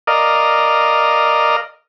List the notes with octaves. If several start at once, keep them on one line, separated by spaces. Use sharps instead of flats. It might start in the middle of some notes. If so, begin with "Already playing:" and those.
A#4 D5 D#5 F5